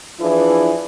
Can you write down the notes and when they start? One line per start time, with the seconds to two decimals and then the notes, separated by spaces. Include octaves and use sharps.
0.20 E3 F3 D4 E4 G#4 B4